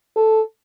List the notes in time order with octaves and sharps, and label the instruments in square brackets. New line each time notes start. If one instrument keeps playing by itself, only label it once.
[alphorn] A4